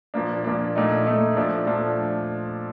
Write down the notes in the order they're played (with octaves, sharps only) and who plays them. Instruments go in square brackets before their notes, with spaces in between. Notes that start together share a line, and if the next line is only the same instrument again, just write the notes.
[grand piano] A#2 F3 A#3 D4
A#2 F3 A#3 D4
A#2 A3 D#4
A#2 A3 D#4
A#2 F3 A3 D4
A#2 F3 A3 D4